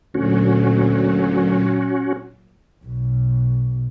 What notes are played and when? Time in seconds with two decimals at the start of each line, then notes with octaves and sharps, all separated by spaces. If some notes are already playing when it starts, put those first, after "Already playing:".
0.15 D2 A#2 F#3 C#4 F#4
2.84 B1 B2